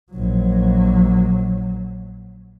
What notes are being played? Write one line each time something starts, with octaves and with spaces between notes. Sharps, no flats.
A#1 F#3